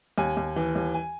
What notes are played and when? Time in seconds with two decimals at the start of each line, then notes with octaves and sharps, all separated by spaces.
0.18 D#2 G#5
0.37 D#2
0.56 E3
0.75 D#2
0.94 G#5